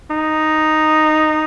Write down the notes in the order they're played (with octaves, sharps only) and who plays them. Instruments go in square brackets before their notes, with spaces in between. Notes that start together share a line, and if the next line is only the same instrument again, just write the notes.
[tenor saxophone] D#4